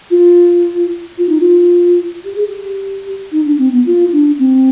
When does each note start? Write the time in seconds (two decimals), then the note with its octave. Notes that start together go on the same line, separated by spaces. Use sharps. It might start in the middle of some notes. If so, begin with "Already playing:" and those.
0.10 F4
1.18 F4
1.29 D#4
1.40 F4
2.25 G4
2.36 G#4
2.47 G4
3.32 D#4
3.45 D4
3.59 C4
3.72 B3
3.86 F4
4.13 D4
4.39 C4